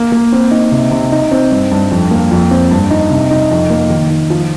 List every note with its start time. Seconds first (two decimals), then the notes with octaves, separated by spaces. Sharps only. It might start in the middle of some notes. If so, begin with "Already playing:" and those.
Already playing: A#3
0.12 A#3
0.32 C4
0.51 D#4
0.72 C3
0.91 C3
1.12 D#4
1.31 C4
1.52 G2
1.72 G2
1.91 F2
2.11 A#3
2.31 F2
2.51 C4
2.71 G2
2.91 D#4
3.10 C3
3.31 D#4
3.51 F2
3.70 A#3
3.90 D#3
4.10 D#3
4.30 F3